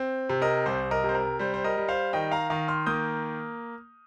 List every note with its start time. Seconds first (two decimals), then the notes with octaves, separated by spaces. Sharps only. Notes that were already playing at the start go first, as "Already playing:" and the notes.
Already playing: C4
0.29 C3
0.42 A#4 D#5
0.66 C2 C5
0.91 A#4 D#5
1.03 C3
1.09 C5
1.15 A#4
1.39 G3 C5
1.54 C5
1.64 A#4 D#5
1.77 G3
1.88 C5 F5
2.13 D#3 D#5 G5
2.31 F5 A#5
2.50 D#3 F5 A#5
2.68 C6 F6
2.87 A#3 D#6 G6